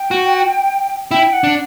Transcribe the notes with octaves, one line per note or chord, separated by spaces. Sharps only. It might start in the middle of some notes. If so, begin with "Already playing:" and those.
Already playing: G5
F#4
E4 G5
F#5
D4